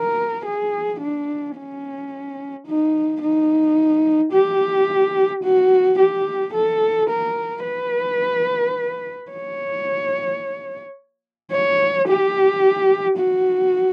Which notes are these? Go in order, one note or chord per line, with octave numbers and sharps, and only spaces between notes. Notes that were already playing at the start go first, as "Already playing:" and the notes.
Already playing: A#4
G#4
D4
C#4
D#4
D#4
G4
F#4
G4
A4
A#4
B4
C#5
C#5
G4
F#4